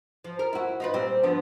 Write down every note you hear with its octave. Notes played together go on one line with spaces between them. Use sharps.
F3
A#4
E4 F#4
D#4 F4 B4
A#2 G3 C4
D3 F3 B3